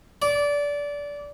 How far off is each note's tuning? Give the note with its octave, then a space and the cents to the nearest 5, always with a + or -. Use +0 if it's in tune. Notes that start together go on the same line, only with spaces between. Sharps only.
D5 -20